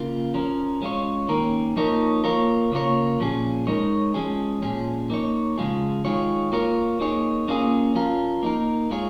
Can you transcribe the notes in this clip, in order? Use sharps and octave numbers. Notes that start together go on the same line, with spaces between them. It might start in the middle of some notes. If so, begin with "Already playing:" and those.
Already playing: C#3 A#3 F4
F3 C#4 A#4
G#3 C#4 F4 C#5
D#3 A#3 C#4 A#4
F3 A#3 D#4 A#4 C#5
A#3 F4 A#4 C#5
C#3 A#3 F4 A#4 C#5
A#2 F3 C#4 G#4
G#3 D#4 A#4 C#5
F3 G#3 C#4 G#4
A#2 F3 C#4 G#4
A#3 D#4 C#5
C#3 F3 G#3 F4 G#4
D#3 G#3 F4 G#4 C#5
A#3 F4 A#4 C#5
A#3 D#4 G#4 C#5
A#3 C#4 F4 G#4
F3 C#4 F4 A#4
A#3 D#4 A#4
G#3 F4 G#4 C#5